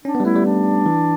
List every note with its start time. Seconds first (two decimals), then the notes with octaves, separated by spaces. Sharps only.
0.05 C#4 D4
0.15 B3
0.20 G3
0.25 A3 E4
0.35 G3
0.45 D4
0.86 E3